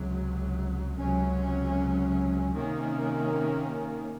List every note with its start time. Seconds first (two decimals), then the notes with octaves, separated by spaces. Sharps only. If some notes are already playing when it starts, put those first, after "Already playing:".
Already playing: C#2 C3 F#3
0.98 C#2 C3 F#3 C#4
2.54 C3 D#3 A#3 C#4